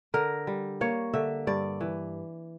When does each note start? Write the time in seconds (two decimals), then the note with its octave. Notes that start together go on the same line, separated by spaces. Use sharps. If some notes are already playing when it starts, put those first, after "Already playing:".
0.14 D3 A#4
0.47 G3
0.81 A#3 C#5
1.14 D3 E5
1.47 G2 D5
1.81 E3